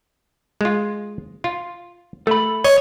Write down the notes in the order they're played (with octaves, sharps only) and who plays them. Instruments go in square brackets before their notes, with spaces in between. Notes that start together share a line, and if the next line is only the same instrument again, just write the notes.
[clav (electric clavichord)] G#3 F4
F4
[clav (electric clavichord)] A3 [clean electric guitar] A4 B5
[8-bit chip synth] C#5 [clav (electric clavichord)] D#5